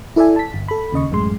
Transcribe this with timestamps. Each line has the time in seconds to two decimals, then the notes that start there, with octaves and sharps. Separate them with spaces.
0.16 E4 A4 D5 E5 G#5
0.36 A5 B6
0.54 G1
0.68 A4 B5
0.92 D#2 C#3 D#5 C#6
1.11 A1 F#2 A2 G#3 C6